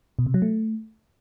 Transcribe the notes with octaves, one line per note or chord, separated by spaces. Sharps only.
B2
C3
F#3
A3